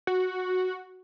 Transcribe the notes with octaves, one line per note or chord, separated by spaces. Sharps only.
F#4